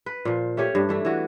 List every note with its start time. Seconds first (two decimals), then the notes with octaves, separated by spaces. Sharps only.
0.06 B4
0.25 A#2 F3
0.57 A3 C#4 G4 C#5
0.75 G2 D4
0.89 E3 A3 E4
1.05 E3 D4 E4 F#4